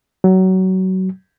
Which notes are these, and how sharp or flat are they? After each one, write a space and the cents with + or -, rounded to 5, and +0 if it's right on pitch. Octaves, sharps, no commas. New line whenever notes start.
F#3 +20